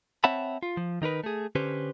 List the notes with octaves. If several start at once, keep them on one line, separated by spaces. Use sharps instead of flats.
C4 C#5 E5 F#5 A5 B5
F4
F3
D#3 D#4 A#4 B4
A3 G#4
D3 C#4 G4 B4 C5